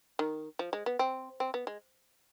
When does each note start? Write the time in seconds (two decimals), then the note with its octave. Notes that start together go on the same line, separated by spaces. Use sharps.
0.19 D#3
0.59 F3
0.73 G#3
0.86 B3
0.99 C4
1.40 C4
1.54 B3
1.67 G#3